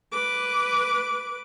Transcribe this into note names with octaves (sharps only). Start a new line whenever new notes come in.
B4 D6